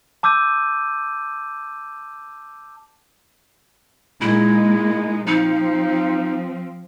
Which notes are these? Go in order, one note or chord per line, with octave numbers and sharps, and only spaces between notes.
A5 D6 E6 G6 D#7
A#2 G#3 D#4 E4
F3 C4 D#4